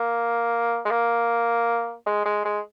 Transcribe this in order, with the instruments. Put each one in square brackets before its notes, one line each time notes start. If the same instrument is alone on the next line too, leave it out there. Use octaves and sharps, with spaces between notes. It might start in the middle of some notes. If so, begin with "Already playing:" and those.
Already playing: [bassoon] A#3
G#3
A#3
G#3
G#3
G#3